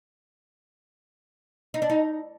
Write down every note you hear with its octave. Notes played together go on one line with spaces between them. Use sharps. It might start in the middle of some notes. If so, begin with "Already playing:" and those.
D#4
D4
D#4